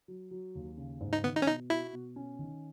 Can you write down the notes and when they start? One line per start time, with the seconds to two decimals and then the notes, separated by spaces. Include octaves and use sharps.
0.08 F#3
0.31 F#3
0.55 D#2
0.77 C#3
1.01 G#2
1.13 D#4
1.24 D#3 B3
1.36 D#4
1.42 C#4
1.47 B2 D#4
1.70 E4 F#4
1.93 B2
2.16 C#4
2.39 D#3